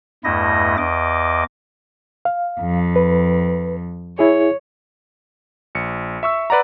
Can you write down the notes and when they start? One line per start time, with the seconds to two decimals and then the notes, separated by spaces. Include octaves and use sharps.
0.24 E2 G2 A3 E4 D#5 A#6
0.77 E2 D#5 D6
2.25 F5
2.60 F2
2.96 B4
4.19 E4 G#4 C#5
5.75 A#1 C#7
6.23 E5 C#6 E6
6.50 B4 D5 F#5 A#5